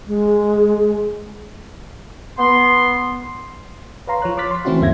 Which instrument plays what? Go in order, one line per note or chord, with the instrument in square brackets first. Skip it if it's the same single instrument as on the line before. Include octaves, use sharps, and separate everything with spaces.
[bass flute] G#3
[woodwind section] B3 C6
[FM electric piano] B4 C#5 F5 A#5 C6
F3 C#5 F#6
C6 D6 F6 F#6 A6 B6
C6
E3 A3 C4 C#4 E4 F#4
D2 G2 A#3 E5 G#6 A#6